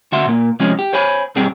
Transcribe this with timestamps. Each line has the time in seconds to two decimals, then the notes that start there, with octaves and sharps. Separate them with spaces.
0.12 D2 F#4 E5 C6
0.27 A#2 A#3
0.60 C3 F3 G#3 C#4 G#4
0.79 G4
0.93 C5 C#5 G#5 B5
1.36 B1 F#2 G3 C4 G#4 G5